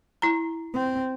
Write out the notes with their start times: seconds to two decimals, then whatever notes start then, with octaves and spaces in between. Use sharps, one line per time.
0.22 E4 A#5
0.74 C4